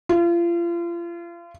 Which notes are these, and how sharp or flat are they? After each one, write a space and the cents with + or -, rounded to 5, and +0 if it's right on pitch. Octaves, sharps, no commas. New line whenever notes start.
F4 -35